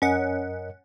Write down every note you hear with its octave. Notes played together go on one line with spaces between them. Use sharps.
F#2 C#4 A#4 D#5 F#5